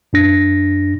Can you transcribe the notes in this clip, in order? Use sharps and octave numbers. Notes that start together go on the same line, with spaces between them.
F#2 D4 A#6